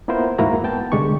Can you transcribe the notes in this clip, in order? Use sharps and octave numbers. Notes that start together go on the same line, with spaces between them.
A#3 B3 E4 F4 A#4 C5
E2 G#2 A#3 E4 F#4 A#5
B3 G5 A5
C2 D3 G#3 G4 C#6